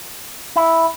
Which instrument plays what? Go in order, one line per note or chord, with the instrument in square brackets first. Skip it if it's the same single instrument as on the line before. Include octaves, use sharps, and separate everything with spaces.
[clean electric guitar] E4